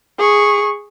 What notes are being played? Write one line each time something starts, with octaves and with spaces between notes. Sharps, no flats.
G#4 C#6